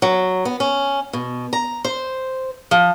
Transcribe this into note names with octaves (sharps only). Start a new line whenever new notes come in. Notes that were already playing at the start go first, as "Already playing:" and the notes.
F#3
B3
C#4
B2
A#5
C5
F3